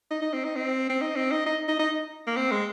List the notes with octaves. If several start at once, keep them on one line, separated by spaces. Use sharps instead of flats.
D#4
D#4
C4
D#4
C4
C4
D#4
C4
D#4
D#4
D#4
D#4
A#3
C4
G#3